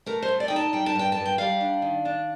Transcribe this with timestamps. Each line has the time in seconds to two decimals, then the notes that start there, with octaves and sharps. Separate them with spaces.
0.06 A3 A#4
0.22 C5
0.28 A3
0.40 D5
0.48 D#4 G5
0.56 A5
0.73 G3 G5
0.86 A5
0.95 G2 G5
1.12 G2 A5
1.25 G5
1.38 G3 F5
1.61 D4
1.82 D#3
2.05 D4